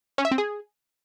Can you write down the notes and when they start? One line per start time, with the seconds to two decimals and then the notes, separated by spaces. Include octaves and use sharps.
0.18 C#4
0.25 E5
0.31 C4
0.38 G#4